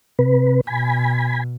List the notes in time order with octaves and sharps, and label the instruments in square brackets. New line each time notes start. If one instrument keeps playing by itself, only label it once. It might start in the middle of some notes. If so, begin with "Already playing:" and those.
[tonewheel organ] C3 B4
[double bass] B2 [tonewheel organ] G#5 B5